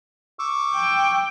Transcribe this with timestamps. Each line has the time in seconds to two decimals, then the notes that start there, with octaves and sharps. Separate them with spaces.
0.39 C#6 D6 E6
0.74 G5